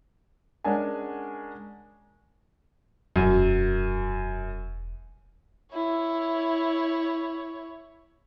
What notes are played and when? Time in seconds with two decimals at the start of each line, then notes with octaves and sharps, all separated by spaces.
0.64 G#3 C#4 D4 A#4 F#5 G#5
3.16 E1 F#2
5.73 E4 C#5